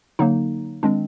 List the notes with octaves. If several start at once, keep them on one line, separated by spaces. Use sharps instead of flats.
D3 F#3 A#3 D#4
D#3 G#3 C4 D4